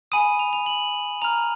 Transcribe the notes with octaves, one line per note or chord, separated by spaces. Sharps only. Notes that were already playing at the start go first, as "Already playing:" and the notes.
G#5 B5 D#6 D#7
F7
F7
F#7
A#5 F6 F7